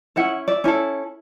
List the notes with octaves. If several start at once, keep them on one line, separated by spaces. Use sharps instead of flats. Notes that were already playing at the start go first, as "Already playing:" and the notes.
C#4 E4 A4 E5 F#5
D5 E5
C#4 E4 A4